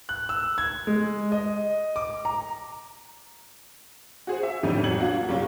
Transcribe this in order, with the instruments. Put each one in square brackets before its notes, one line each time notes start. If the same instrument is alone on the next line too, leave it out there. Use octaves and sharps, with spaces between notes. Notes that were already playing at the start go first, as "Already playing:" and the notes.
[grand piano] F#6
E6
G#6
G#3
D#5
D6
A#5
[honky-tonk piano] F#4 G#4 C5
E5
F2 A2 D3 G3 C#4 D#4
A1 F#3 G#6 C#7 F#7
A#3 D4 F4 F#4
F1 B1 C#3 F4 G4 C#5